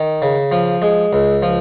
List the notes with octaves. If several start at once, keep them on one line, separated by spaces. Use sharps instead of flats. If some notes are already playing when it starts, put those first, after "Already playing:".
Already playing: D#3
C#3
F3
G#3
C#2
F3